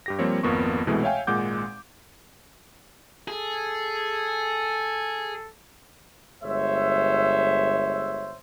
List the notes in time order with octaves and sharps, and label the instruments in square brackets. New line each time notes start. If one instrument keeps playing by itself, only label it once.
[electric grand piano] G2 G4 A#6
F3 G3 A#3 C4 C#5
G#1 F2 A#3 B3 C#6
C2 B2 E3 G#3 A3 C4
C#5 E5 F5 G5 G#5
G#1 A#2 G#3 F#5 D6 G6
[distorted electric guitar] G#4 [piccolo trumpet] A4
[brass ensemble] G1 G#3 C5 C#5 E5